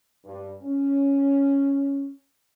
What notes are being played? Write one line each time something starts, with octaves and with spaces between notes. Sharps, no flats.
G2
C#4